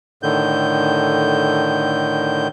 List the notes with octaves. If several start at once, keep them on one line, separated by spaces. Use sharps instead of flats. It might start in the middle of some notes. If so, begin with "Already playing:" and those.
A2 D3 D#3 G6